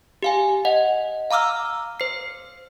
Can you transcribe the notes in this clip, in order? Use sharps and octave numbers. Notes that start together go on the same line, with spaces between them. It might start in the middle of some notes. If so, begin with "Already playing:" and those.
G4 F5 G#5
D#5 F#5
F5 A#5 D6 E6 F6
C5 C7